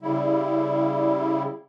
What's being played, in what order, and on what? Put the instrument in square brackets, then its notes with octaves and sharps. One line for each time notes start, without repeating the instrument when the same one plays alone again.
[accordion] C#3 G3 E4